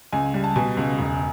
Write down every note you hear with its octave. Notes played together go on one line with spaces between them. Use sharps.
C#2 G#5
G3
A5
B2 G#5
C#2
E1